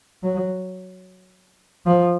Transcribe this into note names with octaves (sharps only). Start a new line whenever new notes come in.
F#3
F3